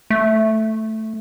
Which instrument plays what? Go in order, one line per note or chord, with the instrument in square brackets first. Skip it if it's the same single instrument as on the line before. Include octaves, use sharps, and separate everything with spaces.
[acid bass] A3